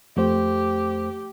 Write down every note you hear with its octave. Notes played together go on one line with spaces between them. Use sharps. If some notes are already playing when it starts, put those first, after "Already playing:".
F2 A3 G4 C5